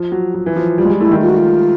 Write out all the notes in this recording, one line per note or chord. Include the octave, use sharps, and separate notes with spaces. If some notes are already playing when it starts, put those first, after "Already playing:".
Already playing: F3
F#3
F#3
E3
F3
G3 F4
G#3
G3
A3 E4
D#3
F4
F#4
F4